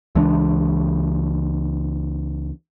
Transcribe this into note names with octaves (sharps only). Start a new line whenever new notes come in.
C#2 E3 G#3 D4